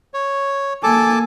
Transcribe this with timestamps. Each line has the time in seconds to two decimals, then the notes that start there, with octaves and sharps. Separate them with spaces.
0.14 C#5
0.83 A#3 A4 G#5 A5 D6